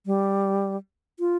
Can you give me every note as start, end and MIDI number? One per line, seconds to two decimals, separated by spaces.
0.06 0.76 55
1.20 1.37 65